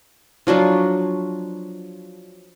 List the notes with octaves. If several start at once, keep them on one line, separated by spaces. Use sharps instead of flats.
F3 F#3 D4 F4